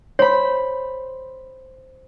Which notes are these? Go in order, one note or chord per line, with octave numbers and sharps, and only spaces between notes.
C5 C#5 B5